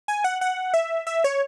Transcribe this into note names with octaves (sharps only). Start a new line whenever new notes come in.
G#5
F#5
F#5
E5
E5
C#5